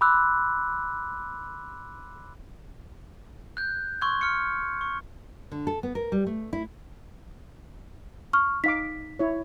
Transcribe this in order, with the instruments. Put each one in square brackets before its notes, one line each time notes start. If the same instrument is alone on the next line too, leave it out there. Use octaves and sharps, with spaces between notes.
[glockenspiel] B5 C6 D6 E6 F#6
F#6 G6
C6 C#6 E6 F#6 G#6
F6 C#7
C#6
[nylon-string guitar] D3
A4
B3
A#4
G3
A3
E4
[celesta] C#6 F6
[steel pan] D#4 F5 D6 [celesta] B6
[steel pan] E4 C#5